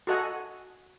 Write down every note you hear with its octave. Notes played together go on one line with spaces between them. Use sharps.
F#4 A4 D#5 F#5 G#5